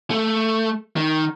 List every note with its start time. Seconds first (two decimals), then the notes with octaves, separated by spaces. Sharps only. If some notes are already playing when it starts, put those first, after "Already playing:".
0.11 A3
0.96 D#3